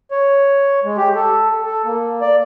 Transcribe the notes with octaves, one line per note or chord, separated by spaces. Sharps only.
C#5
G#3
G4
A4
A4
A#3
D5